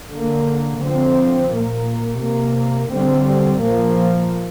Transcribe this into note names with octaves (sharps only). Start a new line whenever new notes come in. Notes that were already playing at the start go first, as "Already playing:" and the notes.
D3 A#3
D3 F3 C4
A#2 A#3
C3 A#3
D3 G3 C4
A#2 F3 A#3